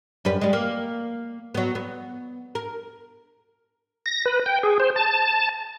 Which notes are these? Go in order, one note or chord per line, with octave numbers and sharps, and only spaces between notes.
F#2 G3 B4
G3 G#3
A#3
F#3 B3
B3
A#4
A#6
B4
G5
G#4
C5
A5